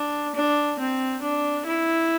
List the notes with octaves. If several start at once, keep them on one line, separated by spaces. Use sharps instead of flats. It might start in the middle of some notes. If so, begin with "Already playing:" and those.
Already playing: D4
D4
C4
D4
E4